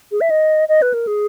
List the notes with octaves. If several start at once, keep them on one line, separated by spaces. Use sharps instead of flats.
G#4
E5
D#5
D#5
B4
A#4
G#4